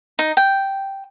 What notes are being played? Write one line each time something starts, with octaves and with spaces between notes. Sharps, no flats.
D#4
G5